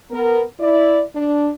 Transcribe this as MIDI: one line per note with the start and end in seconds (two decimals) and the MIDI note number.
0.11 0.42 59
0.11 0.42 70
0.59 1.01 64
0.59 1.01 74
1.15 1.50 62